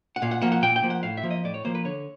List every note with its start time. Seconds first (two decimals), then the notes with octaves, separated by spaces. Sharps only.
0.16 F#5
0.22 A#2 F5
0.31 F#5
0.42 F3 A#3 F#5
0.52 F#5
0.62 A#2 G5
0.76 G5
0.83 F3 A#3
0.90 F#5
1.03 A2 F5
1.17 E5
1.23 F3 A#3
1.31 D#5
1.44 A2 D5
1.54 C#5
1.65 F3 A#3 C5
1.75 B4
1.85 D3 C#5